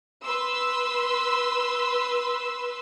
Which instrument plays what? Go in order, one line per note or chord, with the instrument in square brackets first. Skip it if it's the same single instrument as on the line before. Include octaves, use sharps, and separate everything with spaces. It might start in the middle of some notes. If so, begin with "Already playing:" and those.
[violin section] B4 C6 E6